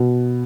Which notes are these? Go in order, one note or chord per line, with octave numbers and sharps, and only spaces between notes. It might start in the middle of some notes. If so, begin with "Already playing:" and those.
Already playing: B2